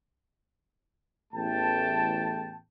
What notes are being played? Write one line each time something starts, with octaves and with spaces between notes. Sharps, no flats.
A1 E2 A3 G5 A5